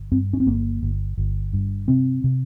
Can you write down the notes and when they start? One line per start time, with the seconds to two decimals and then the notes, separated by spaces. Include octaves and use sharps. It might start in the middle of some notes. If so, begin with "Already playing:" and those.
Already playing: G1
0.11 G2 C4
0.33 C#4
0.40 C4
0.46 G1 A#3
0.82 G1
1.18 G1
1.53 G2
1.88 C3 C4
2.24 C3